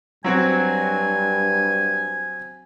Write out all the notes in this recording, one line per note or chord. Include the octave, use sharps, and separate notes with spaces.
G2 F#3 C4 F#4 G#5